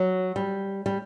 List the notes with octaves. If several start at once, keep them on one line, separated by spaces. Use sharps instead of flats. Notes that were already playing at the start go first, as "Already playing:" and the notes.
Already playing: F#3
G3
G3